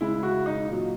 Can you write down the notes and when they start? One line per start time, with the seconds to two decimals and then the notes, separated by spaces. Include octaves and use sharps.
0.01 C#3 G#3 E4
0.23 F#4
0.46 D#4
0.68 A#2 F#3